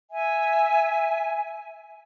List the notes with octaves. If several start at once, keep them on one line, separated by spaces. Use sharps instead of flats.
E5 G#5